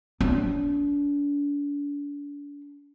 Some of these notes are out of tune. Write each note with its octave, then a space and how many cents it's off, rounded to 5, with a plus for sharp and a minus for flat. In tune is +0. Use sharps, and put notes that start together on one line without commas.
D4 -35